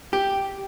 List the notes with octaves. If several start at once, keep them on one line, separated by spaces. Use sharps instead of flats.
G4